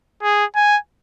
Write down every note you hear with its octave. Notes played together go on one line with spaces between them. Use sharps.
G#4
G#5